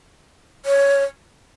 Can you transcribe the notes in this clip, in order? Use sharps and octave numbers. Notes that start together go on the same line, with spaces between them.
C#5